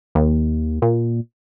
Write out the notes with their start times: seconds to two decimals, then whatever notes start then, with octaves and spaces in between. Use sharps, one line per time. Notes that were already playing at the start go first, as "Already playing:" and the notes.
0.15 D#2
0.82 A#2